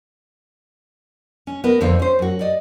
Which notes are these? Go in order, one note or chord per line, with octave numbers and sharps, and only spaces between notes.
C#4
B3 A#4 B4
F2 D3 F3 F4
C#4 C5
F#2 F#4
D5 D#5